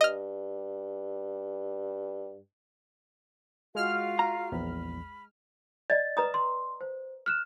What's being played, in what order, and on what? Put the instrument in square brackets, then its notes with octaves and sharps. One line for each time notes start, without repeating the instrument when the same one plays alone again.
[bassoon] G2 [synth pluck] D#5 F6
[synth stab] G#3 F6 [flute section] F4 F#4 F5
[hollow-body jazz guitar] A#5
[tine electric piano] A#1 E2 [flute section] B5
[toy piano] D5 D#5 [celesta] A6
[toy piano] B4 A#5 D#6
[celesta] C6
C5
F6 F#6 E7